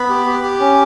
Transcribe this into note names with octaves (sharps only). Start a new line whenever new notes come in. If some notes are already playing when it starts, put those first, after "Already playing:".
Already playing: B3 B5
G4
G4
G4
C#4